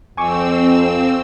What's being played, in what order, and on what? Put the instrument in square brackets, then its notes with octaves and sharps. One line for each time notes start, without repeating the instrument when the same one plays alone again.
[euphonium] F2 [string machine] C4 E6 [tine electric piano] G#5 C#6 D6